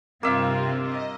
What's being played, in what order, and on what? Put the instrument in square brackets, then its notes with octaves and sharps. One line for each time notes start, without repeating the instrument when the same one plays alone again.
[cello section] G2 C4 F4 [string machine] C3 [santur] A#3 E5
[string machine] D#5